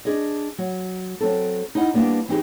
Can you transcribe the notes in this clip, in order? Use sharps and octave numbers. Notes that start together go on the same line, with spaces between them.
D4 G#4 D#5
F#3
F#3 C4 A4
D#4 E4 D#5 F#5
G3 A#3 B3 D4
E3 C4 D#4 G4 G#4